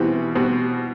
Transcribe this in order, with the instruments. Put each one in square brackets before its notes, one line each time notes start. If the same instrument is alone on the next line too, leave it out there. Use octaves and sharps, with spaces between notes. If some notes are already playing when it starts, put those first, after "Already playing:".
Already playing: [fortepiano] B2 G3 C4 [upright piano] E3
[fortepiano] B2 G3 C4